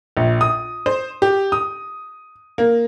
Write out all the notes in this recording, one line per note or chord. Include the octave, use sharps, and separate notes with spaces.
A#1
D#6
C5
G4
D#6
A#3